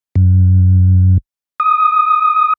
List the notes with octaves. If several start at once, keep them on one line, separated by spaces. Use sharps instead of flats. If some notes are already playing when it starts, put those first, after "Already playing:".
F#2
D#6